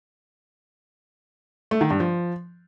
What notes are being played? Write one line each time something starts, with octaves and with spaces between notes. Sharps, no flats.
A3
D#3
G2
F3